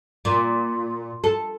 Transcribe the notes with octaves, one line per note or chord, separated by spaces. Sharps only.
A#2
A4